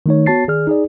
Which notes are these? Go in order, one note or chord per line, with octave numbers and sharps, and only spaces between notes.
D#3 A3 D#4 C#5
B3 F#4 C#5 A5 A6 C7
D#3 G#4 D5 F6
D#4 G#4 D5